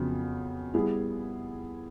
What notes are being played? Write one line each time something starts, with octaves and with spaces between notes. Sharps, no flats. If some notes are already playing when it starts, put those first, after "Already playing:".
Already playing: F2 C#3 F#3 B3
G3 B3 E4 G#4